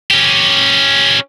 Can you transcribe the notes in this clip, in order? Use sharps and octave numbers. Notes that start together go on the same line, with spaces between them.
C#4 G4